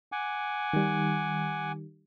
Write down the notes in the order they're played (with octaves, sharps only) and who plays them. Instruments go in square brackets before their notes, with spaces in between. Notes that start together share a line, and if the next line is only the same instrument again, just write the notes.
[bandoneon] F#5 G#5 D6
[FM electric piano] D#3 G3